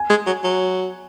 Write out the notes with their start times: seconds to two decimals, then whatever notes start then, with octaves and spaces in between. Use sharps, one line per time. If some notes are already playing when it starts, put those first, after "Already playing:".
Already playing: G#5
0.10 G#3
0.27 F#3
0.44 F#3